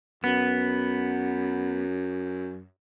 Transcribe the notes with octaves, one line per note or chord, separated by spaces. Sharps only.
F#2 B3